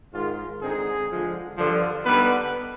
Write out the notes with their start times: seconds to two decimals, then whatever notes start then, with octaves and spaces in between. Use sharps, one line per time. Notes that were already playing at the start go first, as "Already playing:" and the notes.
0.13 G#2 D#3 G#3 F4
0.61 D3 G#3 C4 D#4 G#4
1.09 D3 F3 G#3
1.56 G2 D3 F3
2.05 D3 G3 B3 D#4 B4